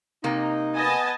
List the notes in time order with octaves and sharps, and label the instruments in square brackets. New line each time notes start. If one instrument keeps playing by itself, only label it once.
[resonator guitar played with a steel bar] C3 A#3 [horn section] D#4
[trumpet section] B3 [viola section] D#5 G#5 A5